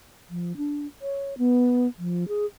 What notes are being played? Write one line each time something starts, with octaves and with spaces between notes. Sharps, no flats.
F3
D4
C#5
B3
F3
G#4